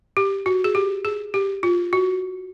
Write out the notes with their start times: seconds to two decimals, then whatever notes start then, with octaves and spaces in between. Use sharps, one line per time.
0.17 G4
0.46 F#4
0.64 G#4
0.75 G4
1.05 G#4
1.34 G4
1.63 F4
1.93 F#4